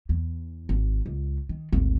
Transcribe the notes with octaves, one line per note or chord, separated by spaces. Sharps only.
E2
G#1
C#2
D#3
G#1 D2